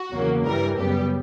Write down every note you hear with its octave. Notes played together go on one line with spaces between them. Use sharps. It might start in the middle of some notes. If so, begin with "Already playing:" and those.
Already playing: F#4
E2 C#3 F#3 A#3
G2 E3 G3 A#4
F#2 C#3 G3 B3 G4